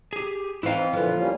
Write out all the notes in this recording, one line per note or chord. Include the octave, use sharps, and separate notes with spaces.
G4 G#4
E3 C4 D#4 E4 F5
A#2 D3 E3 F3 B3
G3 A#3 C#4